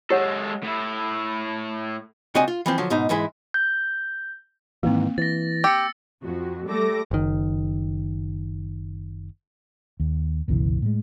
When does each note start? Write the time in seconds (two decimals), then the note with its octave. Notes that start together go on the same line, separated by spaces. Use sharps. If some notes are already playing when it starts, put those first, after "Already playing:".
0.10 G#3 G4 A4 C#5 F#5
0.63 A2 E4
2.35 C#2 C4 F#4 D5 D#5 G#5
2.48 F4
2.66 E3 F3 C4
2.78 D3 F3 F#3
2.90 G#2 B2 D#4
3.09 G#2 E3 G#3 E4
3.54 G6
4.83 G#2 D#3 E3 A#3 C4
5.18 E3 A6 A#6
5.64 G4 E6 C#7
6.23 F2 F#4
6.68 G3 A3 A4 D6 A#6
7.11 F#1 D#3
10.00 D#2
10.48 G1 C#2 B2 E3
10.82 A2 G#3